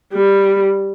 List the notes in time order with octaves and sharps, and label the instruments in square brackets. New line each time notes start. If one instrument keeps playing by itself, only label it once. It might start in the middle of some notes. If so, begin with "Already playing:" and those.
[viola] G3